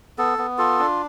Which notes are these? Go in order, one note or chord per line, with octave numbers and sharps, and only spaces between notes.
B3 A4
B3
F4 A4
D4